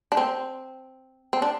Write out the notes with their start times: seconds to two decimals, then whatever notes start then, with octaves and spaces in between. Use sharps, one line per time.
0.12 D4
0.17 C4
1.33 C4
1.42 D4